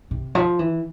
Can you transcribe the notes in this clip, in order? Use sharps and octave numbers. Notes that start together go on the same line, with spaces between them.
C3
F3
E3